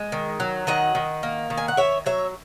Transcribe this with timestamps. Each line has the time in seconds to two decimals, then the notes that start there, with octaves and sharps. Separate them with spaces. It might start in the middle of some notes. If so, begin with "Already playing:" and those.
Already playing: G#3 D#5
0.12 D#3
0.40 F#3
0.67 D#3 D#5 F#5
0.95 D#3
1.23 A#3
1.50 D#3
1.57 G#5
1.68 F#5
1.77 D#3 C#5 E5
2.06 F#3 C#5 E5